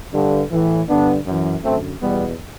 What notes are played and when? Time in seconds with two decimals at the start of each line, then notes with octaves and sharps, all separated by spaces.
0.12 G2 D3
0.51 A2 E3
0.88 G2 D3 B3 D4
1.26 F#2 E3
1.64 F#2 D3 A3 C4
2.02 E2 B2 G3 B3